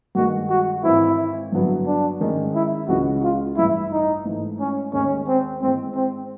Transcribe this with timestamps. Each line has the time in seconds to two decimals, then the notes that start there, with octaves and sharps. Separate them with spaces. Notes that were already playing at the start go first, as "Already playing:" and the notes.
0.15 G2 D#3 G#3 F#4
0.50 F#4
0.83 G#1 G#2 E3 E4
1.52 G2 D3 F#3 B3
1.86 D4
2.21 G#2 D#3 G#3 C#4
2.55 E4
2.88 C#2 C#3 E3 G#3 C#4 F#4
3.23 F4
3.57 A1 G2 E3 E4
3.92 D#4
4.25 G#2 E3 A3
4.60 C#4
4.93 D#2 D#3 G#3 C#4
5.28 C4
5.62 G#1 G#2 E3 G#3 C4
5.96 C4